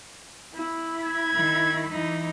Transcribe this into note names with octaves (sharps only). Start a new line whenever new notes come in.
E4 B5
G#6
D#3
E3 D#4